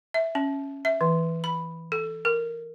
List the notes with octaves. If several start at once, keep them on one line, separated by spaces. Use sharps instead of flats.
E5
C#4
E5
E3
B5
A4
A#4